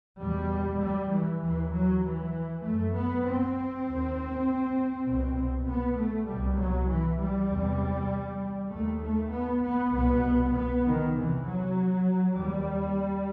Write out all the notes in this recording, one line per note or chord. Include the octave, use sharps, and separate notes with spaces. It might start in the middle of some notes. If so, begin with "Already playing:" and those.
E2 B2 G3
G3
E3
D#2 E3
F#3
E3
F#2 A3
B3
C4
D#2
C2 B2
B3
A3
C2 B2 G3
F#3
E3
G3
E2 C3
D#2 A3
A3
B3
B3
C2 B2 B3
B3
D#3
E2 C3 E3
F#3
D#2 G3